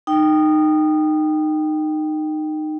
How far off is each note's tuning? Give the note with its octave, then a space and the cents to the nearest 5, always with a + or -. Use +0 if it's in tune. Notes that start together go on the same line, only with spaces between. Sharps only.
D#4 -20 G5 +0